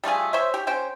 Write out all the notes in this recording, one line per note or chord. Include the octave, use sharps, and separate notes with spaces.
G3 A3 F4 G#4
C5 C#5 E5
G4
C#4 C5 G5